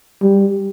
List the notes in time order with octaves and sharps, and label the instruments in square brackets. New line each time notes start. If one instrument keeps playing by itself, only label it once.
[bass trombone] G3